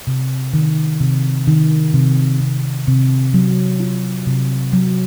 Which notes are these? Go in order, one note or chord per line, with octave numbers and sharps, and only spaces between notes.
C3
D#3
C3
D#3
C3
C3
C3
F#3
F4
C3
F#3